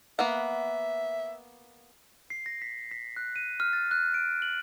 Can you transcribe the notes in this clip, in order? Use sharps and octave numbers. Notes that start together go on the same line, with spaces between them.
A#3 B3 E5 F#5
C7
A#6
B6
B6
F#6
D#7
F6
A6
F#6
D7
F#7